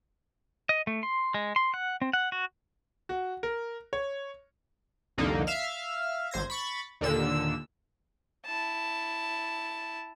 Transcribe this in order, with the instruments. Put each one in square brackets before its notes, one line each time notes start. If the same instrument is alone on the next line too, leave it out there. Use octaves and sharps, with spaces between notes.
[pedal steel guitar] D#5
A3
C6
G#3
C6
F#5
C4
F#5
F#4
[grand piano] F#4
A#4
C#5
[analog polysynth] C2 F2 D3 A#3 D#4
E5 F5 F6
G#1 C5 G#6 A#6
B5 C#6 A6
D#2 A#2 D3 E6
[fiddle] E4 A5